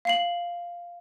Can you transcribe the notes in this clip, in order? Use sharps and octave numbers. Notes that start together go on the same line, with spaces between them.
F5 C7 F#7